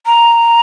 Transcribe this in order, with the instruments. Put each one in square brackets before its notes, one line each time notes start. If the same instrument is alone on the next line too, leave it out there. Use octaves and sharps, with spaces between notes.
[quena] A#5